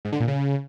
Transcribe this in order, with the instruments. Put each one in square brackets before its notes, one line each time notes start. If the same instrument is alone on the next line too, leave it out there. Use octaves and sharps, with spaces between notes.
[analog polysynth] G#2
D3
A#2
C#3